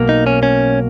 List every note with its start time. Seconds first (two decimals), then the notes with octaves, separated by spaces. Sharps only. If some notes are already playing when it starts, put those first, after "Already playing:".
Already playing: B1 B2 A#3
0.09 D#4
0.27 C#4
0.43 C#4